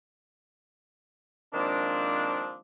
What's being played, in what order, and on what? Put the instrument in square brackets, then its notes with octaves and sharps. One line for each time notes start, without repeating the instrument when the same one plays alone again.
[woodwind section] D#3 F3 G#3 A#3 C4 D4